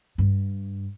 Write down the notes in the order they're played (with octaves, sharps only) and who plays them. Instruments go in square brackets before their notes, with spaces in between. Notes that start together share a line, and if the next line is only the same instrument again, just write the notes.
[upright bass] G2